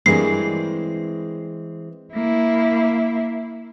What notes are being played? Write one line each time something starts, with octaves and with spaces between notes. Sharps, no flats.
G2 E3 G#3 A#3 C4 G#4 C7
A#3 E4